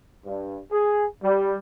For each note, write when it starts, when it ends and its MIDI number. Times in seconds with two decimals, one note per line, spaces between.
0.24 0.59 43
0.72 1.06 68
1.23 1.57 55